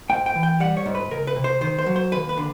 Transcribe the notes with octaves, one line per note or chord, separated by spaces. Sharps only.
G#2 G5
G5
E3
G5
G3 F#5
C#5
G#2
B4
C#2 A#4
B4
C3
C5
D#3 C5
C5
F#3
C5
D#2 B4
B4
D3